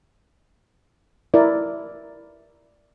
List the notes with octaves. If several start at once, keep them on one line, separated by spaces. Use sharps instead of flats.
E4 A#4 D5